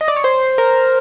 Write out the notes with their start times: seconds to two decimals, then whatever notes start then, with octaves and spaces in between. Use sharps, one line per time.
0.01 D#5
0.08 D5
0.16 C#5
0.24 C5
0.58 A#4